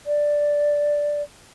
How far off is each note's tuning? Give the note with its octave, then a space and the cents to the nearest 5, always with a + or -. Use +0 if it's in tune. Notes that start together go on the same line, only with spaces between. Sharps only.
D5 +0